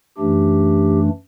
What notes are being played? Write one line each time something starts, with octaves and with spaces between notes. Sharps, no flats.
F#2 E3 A3 D4 G4